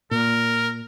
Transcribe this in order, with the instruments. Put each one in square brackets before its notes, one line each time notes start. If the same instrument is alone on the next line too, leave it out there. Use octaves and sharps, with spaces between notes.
[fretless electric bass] A#2 [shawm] A#4